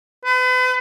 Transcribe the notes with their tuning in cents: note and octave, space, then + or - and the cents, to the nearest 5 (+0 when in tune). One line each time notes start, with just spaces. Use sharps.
B4 +40